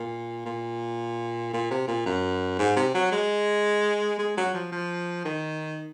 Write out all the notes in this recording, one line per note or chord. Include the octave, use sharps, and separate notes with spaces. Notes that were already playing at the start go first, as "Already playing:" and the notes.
Already playing: A#2
A#2
A#2
C3
A#2
F#2
G#2
C3
F#3
G#3
G#3
F#3
F3
F3
D#3